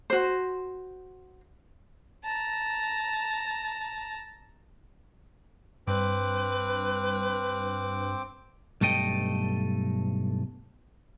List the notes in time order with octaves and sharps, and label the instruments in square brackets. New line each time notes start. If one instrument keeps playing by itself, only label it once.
[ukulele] F#4 C5
[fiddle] A5 A#5
[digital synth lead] G2 [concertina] C4 D6 [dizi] B4
[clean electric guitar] B1 G2 A3 A4 D#5 G5